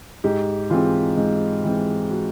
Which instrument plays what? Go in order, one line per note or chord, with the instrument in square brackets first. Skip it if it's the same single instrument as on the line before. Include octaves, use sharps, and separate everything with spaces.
[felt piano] G#2 G4
E3 G#3 C4 F4
G#2
E3 G#3 C4
F#4